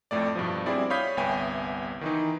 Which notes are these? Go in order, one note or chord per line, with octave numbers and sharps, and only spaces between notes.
F2 A2 A3 D5
G2 B2 F3
G3 C4 E4 G#4 D5
C#5 F5 B5 D#6 G6 B6
G1 C2 B3 E5 G5 G#5
D#3 E3 D#4